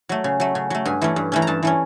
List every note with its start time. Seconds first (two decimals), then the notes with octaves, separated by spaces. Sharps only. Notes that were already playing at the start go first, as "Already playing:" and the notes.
0.09 F#3 A3
0.24 C#3
0.40 F#3 A3
0.55 C#3
0.70 F#3 A3
0.85 G2 G#5
1.01 E3 A3 C#4
1.16 G2
1.32 E3 A3 C#4
1.42 A#5
1.47 G2 A5
1.63 E3 A3 C#4